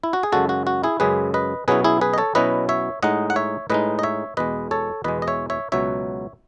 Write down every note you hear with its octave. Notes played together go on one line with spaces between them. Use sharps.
E4
F#4
G#4
F#2 C#3 G#3 F#4 A4
F#4
F#4
E4 G#4
F#2 C#3 G#3 G#4 B4
B4 D#5
B2 F#3 C#4 E4 G#4 B4
E4 G#4
G#4 B4
D#5
A4 C#5
B2 F#3 C#4 E4 B4 D#5
C#5 E5
A2 G#3 D#4 D#5 F#5
F#5
C#5 E5
A2 G#3 D#4 B4 D#5
D#5
C#5 E5
E2 B2 G#3 B4 D#5
A4 C#5
E2 B2 G#3 B4 D#5
D#5
C#5 E5
C#5 E5
C#2 B2 F#3 C#5 E5